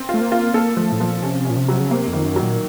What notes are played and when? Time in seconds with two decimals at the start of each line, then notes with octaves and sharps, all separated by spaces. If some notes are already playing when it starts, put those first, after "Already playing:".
Already playing: C4
0.09 F4
0.14 A3
0.21 A#3
0.32 F4
0.54 A#3 A4
0.77 F3 A3
0.92 A2
1.00 A#2 F3
1.22 C3 C#4
1.45 A#2 C#4
1.57 C3
1.68 F#3
1.80 C#3
1.91 C3 A#3
2.08 F2
2.13 D#3
2.24 F#2
2.36 F#3
2.42 A#2